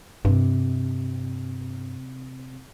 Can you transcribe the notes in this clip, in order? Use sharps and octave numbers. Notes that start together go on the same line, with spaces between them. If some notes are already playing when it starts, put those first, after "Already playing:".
G2 C3